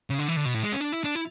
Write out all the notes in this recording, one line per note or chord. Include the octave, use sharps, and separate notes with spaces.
C#3
D3
E3
D3
B2
A2
G#3
C#4
D4
E4
D4
E4